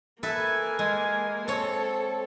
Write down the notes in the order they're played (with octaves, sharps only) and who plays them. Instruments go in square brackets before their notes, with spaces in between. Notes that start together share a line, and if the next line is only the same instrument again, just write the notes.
[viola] A#3 G#5 [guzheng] A4 B4 E5
[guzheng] G#3
[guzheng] C4 C#5 [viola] A4